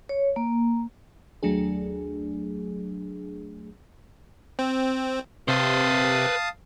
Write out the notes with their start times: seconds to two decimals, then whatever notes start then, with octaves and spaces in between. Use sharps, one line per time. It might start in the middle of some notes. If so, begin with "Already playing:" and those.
0.09 C#5
0.36 A#3
1.43 D#2 F#3 A3 D4 G#4
4.59 C4
5.48 C3 B4 C5 F5 A5 D#6